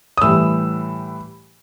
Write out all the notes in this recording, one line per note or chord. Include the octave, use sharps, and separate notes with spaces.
D#6
A2 E3 G3 E6